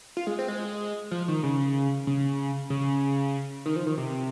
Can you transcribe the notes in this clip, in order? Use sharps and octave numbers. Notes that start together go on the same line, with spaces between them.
F4
G#3
C4
G#3
F3
D#3
C#3
C#3
C#3
D#3
F3
D#3
C3